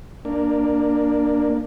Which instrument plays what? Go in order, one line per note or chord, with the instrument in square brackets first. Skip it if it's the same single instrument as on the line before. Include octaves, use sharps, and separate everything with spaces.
[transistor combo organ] A#3 D4